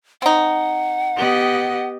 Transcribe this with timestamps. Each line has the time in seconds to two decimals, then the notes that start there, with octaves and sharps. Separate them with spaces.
0.22 C4 D#4 F#5
1.16 B3 G4 D#5